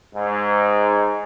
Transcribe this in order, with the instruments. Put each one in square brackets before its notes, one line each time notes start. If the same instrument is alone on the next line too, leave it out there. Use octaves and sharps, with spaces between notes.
[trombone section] G#2